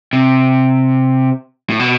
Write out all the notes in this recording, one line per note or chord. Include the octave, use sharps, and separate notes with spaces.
C3
A2
B2